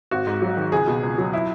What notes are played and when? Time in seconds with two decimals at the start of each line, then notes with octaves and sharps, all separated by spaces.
0.11 G#1 F#4
0.27 G#2
0.42 F#3
0.57 D#3
0.72 C#2 G#4
0.87 B2
1.03 C#2
1.18 F#3
1.33 E4